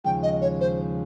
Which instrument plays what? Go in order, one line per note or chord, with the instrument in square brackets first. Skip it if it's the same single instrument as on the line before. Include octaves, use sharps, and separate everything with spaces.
[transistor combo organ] D#2 C#3 F3 G#3 [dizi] G5
[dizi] D#5
C#5
C5